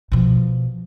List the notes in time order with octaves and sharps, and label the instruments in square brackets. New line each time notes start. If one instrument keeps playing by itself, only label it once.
[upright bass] B2 F3